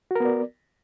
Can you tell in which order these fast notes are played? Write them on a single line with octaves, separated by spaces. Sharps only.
F#4 A#4 B3 D5